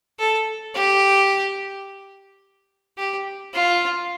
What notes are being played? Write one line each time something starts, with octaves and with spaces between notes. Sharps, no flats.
A4
G4
G4
F4